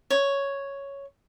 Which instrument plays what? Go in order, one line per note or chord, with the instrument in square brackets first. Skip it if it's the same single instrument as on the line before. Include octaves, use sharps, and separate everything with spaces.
[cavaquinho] C#5